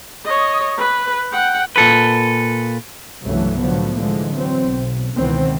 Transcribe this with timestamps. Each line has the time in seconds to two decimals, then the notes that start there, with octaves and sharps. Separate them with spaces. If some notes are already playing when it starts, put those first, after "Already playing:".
0.25 C#5 D#5
0.78 B4
1.32 F#5 G5
1.76 A#2 A4 B4
3.22 C2 G2 C#3 E3 F#3 A3
3.59 A2 D3 F3 F#3 B3
3.98 D3 E3 F3 G#3
4.32 E3 F#3 C4
4.61 B1
5.19 C#2 B2 D#3 E3 B3 C4